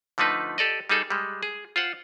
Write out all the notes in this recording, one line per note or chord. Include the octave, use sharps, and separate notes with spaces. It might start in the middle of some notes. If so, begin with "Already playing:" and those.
D3 F3 A3 D#4 B4
G4 A4 D5 D#5
G3 D#4 G#4 A4
G3 G#3
G#4
F4 C5 F#5